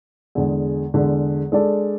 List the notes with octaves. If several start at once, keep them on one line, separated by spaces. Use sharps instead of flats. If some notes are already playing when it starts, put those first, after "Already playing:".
E2 D3 G#3
E2 D3 G#3
G#3 D4 A4 D5